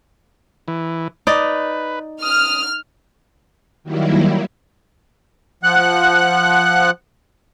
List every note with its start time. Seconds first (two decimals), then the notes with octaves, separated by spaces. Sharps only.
0.68 E3
1.27 D#4 B4 D5
2.22 D#6 F6
3.84 D#3 F#3 G3 A#3 E4
5.63 F3 F#5 F#6